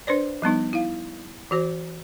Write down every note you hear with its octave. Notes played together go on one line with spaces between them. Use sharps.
D4 B4 C5 D5
F3 G3 B3 D#4
E4 F5
E3 F#4 C5